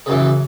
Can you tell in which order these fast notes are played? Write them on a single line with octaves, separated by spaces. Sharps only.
C#3 F#2 E3